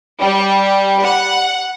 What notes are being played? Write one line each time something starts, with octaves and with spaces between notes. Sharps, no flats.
G3
F#5